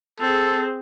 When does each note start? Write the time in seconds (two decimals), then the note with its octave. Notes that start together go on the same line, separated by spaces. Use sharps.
0.20 C4 G#4 A4